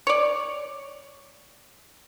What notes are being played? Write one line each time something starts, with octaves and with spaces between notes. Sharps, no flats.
C#5 D5